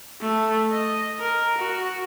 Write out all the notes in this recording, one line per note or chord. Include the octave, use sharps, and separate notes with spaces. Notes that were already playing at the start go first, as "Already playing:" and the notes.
A3
D#5
A#4
F#4